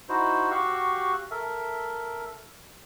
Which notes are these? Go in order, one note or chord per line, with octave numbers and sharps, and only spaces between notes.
D#4 E4 F#4 C5
F#4 G4 F5 C#6 E6 F#6
A4 A#4 E5